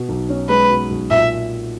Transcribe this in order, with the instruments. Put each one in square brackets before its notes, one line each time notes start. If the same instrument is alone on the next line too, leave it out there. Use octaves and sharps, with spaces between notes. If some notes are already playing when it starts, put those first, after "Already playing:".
Already playing: [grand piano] B2
B1
C#4
[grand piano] G#3 [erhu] B4
[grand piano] B2
B1
[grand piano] A#2 [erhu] E5